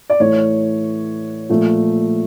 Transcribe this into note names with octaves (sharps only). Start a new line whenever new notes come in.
D5
A2 E3 A3 C#5
A#2 F3 A3